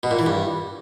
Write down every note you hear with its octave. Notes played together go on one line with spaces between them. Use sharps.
B2
A#2
E3
G2